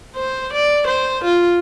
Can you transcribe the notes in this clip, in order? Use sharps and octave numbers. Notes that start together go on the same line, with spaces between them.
C5
D5
C5
F4